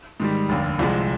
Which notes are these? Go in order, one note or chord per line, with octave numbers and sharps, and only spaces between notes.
G#2 D#3 G3
F1 D#2 D3
C2 C3 F3 G#3